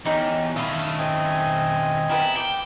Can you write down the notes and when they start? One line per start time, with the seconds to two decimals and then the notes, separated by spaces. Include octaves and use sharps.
0.05 E2 G#3 C#4 D#4 G4
0.56 D#3 A3 C#4 E4 F5 D#6 E6
0.98 C4 D#5 G#5
2.10 B3 E4 G4 A#4
2.37 G5 D6